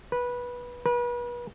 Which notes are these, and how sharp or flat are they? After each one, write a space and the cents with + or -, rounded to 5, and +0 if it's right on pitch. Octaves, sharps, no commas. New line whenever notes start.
B4 -15
B4 -35